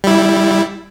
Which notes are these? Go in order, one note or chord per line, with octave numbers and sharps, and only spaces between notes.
G3 E4